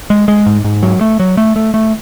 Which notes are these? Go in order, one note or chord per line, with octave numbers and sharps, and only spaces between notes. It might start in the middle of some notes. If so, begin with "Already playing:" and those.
G#3
G#3
G#2
G#2
F#3
A3
F#3
A3
A3
A3